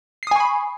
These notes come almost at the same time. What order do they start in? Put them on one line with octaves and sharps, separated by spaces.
C7 D#6 G#5 C#6 B5